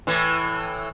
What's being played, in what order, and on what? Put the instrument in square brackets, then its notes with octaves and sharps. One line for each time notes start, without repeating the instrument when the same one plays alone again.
[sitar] A2 E3